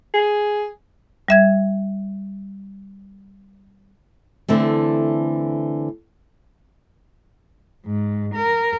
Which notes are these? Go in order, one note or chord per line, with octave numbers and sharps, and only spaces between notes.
G#4
G3 E5 G#6
D3 E3 A3 C4
G#2
A#4